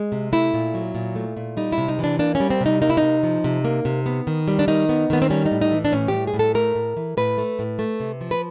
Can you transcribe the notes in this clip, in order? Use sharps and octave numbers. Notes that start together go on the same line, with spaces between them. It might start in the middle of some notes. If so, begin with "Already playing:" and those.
Already playing: G#3
C3
A3 E4
A#2
F#3
A#2
A3
A#2
G3 D#4
E4
C3
D#4
E3 D4
A#3 D4
C#4
G3
C4
C3 D#4
A#3 D#4
E4
D#4
C3
F3
C3
A#3
C3
B3
D#3
G3
D4
D#3 D#4
B3
D#3 B3
C4
G3 C#4
D#4
A2
D#4
E3
D4
A2 C#4
G3 G4
G#4
A2
A4
A3 A#4
A2
E3
A2 B4
A3
A2
A3
C3
F3
B4